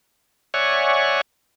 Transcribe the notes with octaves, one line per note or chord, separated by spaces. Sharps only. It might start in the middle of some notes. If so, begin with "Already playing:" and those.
C#5 D5 E5 F#5 G#5 C#6